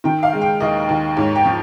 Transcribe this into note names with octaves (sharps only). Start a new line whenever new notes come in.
D#3 G5
F5
G#3
G5
D#2 D#5
D#2
G#2 C#5
G5
F3